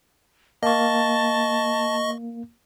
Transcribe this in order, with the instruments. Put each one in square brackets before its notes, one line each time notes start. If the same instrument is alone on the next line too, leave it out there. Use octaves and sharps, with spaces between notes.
[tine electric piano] A#3 [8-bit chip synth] D#5 C#6 [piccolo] A5